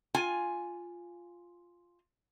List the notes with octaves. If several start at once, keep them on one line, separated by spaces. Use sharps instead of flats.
F4 G#5